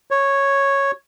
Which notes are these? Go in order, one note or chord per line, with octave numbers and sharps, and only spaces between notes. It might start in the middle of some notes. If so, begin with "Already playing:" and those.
C#5